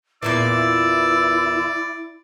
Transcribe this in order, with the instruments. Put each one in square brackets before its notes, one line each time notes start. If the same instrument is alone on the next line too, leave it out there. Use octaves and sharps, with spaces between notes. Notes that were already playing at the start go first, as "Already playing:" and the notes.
[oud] E2 A#2 E3 [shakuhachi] E4 [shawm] D5 [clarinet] E6